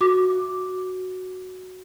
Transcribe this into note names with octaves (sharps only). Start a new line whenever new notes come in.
F#4 D6